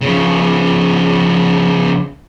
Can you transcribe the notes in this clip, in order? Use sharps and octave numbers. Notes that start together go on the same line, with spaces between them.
C#3 F3